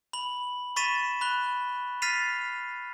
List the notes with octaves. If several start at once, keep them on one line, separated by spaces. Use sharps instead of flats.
B5 F#7
B5 C#6 A6 B6 D#7 E7
B5 F#6 G7
F6 A6 B6 C7 D#7 F7